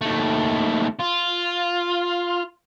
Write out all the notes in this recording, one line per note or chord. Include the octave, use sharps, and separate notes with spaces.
D#2 A3
F4